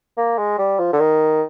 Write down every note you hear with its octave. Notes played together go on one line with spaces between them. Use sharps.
A#3
G#3
G3
F3
D3
D#3